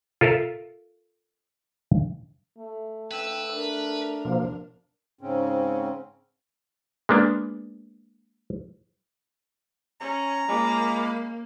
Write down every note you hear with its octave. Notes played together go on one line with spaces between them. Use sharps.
F4 A4 A#4 E5 F5
A3
B4 G5 E6
D4 A#4
B2 F3 A#3
G#2 C#3 C4 C#4
G#3 A#3 B3 D4
C#4 A#5
G#3 A#3 F4 B5 D6